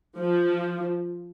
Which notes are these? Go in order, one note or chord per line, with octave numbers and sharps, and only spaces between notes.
F3